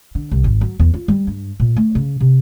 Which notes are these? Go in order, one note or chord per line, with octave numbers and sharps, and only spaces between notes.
D3
C2
G#1
F#3
E2
F4
G3
G2
A#2
A3
C#3
C3